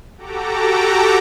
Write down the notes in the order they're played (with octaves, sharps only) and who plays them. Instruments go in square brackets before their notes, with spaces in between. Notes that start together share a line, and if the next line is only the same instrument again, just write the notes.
[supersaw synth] F#4 G4 A4 A#5 D6